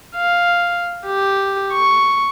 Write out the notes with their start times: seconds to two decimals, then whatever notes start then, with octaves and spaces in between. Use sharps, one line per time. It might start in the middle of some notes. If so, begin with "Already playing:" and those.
0.16 F5
1.06 G4
1.73 C#6